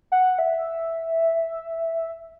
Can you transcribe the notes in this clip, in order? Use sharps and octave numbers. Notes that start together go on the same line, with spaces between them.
F#5
E5